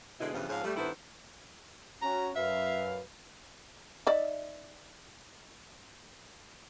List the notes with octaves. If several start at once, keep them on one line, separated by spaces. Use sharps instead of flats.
B2 D3 G#3 D#4 E4 G#4
G2 C#3 E3 F3 B3
G#2 F3 C4 C#4 C5 F5
G3 A3
G2 D#3 B3 E4 A4 C5
C#4 F#4 A#5
F#2 B4 E5 F5
D#4 D5 E5